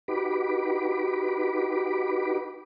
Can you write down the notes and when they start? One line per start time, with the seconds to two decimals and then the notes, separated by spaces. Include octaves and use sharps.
0.08 D#4 F#4 G4 B4 B5 D6